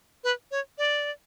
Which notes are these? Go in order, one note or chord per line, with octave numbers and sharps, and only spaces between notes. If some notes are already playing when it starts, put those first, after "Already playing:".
B4
C#5
D5